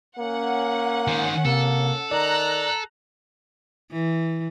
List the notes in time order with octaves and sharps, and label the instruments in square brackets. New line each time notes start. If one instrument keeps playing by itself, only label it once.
[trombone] A#3 [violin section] C#4 F#5
[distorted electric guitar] D#3 C5
[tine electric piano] C3 [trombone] A#3 [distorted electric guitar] A4
[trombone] D#3 [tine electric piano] D5 [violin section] A#5 F#6
[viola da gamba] E3